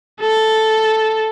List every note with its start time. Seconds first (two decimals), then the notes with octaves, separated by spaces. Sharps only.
0.21 A4